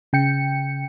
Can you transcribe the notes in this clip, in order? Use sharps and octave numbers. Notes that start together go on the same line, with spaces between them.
C#3 G5 C#7